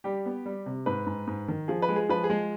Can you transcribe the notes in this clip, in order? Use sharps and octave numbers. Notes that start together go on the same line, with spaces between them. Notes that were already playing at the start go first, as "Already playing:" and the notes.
G3 G4
B3
G3
C3
G#2 B4
G#2
G#2
D#3
F3 G#4
B4
G#3
G#4
F3 B4
G#4
G#3